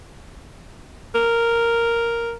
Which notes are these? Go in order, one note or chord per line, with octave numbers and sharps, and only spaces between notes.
A#4